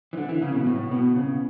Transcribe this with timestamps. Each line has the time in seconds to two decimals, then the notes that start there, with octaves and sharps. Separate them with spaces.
0.13 E3
0.17 D3
0.29 E3
0.42 C#3
0.54 B2
0.66 A2
0.91 B2
1.15 C#3